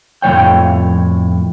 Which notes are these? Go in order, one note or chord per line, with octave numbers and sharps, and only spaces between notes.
F2 A2 E3 C#5 G5